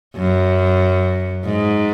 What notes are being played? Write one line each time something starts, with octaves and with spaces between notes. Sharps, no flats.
F#2
G#2